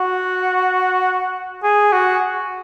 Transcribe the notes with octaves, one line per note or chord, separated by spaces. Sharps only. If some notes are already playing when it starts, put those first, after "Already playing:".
Already playing: F#4
G#4
F#4